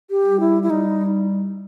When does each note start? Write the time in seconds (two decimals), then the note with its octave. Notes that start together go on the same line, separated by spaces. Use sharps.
0.11 G4
0.25 G3
0.40 E4
0.63 E4
0.70 G3 D#4